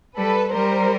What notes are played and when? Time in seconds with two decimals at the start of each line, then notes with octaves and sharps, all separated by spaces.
0.17 G3 A4 B4
0.53 G3 A#4 C5